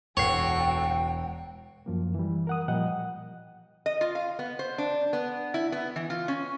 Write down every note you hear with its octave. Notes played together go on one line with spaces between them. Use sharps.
E1 F#4 A4 B4 C#5 G5 C7
F#2 F3 A#3
E3 G3
A#4 F#5 D#6
A#2 F3 G3 D#5 F#5 G5
D#5
F4
F5
B3
C5
D4
B3
E4
B3
E3
F4
C#4